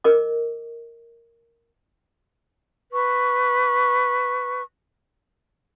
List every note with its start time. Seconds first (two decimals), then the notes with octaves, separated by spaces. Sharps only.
0.04 A#4 D#5 D6
2.92 B4 C#6